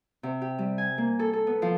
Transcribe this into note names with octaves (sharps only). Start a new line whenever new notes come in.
C3
G4
G3
G#5
A#3
A4
A4
B3
F3